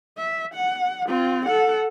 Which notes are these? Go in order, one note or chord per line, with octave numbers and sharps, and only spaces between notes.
E5
F#5
C4 F4
A4 F#5